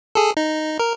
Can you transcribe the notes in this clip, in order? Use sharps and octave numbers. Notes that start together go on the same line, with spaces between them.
G#4 A4
D#4
A#4